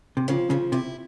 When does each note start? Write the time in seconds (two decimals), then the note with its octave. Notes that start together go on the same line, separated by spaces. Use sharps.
0.17 C3
0.28 C#3 F3
0.50 C#3 F3
0.72 C3 E4